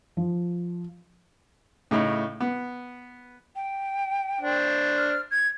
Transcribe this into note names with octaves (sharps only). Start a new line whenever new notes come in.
F3
A2 C#3 D#4 E4
B3
G5
D4 C5
F6
G#6